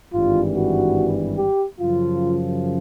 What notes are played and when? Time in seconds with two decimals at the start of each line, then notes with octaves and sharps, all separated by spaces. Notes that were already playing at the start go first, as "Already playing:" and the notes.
0.13 G#1 G2 E3 G3 F4
0.56 F#4
1.38 G4
1.80 F#2 C#3 F3 F4